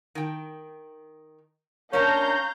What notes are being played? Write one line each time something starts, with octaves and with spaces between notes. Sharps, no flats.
D#3 G5
A#3 C#4 D4 F5 A#5 G6